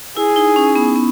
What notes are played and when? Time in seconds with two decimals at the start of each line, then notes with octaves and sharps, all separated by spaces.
0.17 E4 G#4
0.36 D#4
0.56 C#4
0.76 B3
0.96 B3